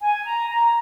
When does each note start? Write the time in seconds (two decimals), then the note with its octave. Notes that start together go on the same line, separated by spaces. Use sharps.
0.01 G#5
0.25 A#5
0.49 A#5